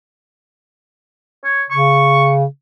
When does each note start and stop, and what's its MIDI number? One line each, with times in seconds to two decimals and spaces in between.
1.44 1.62 73
1.70 2.45 49
1.70 2.31 85